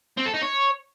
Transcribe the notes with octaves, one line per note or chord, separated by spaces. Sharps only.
C4
A4
D#4
C#5